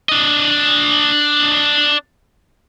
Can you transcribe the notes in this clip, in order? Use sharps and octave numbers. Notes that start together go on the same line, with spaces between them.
D4 D#5